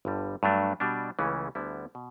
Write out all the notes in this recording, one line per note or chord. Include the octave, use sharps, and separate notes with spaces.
G1 G2 D3 G3
G2 F#3 A3 D4
B2 G3 D4
C#2 C#3 E3 A3 C#4
D2 D3 G3 B3 E4
B2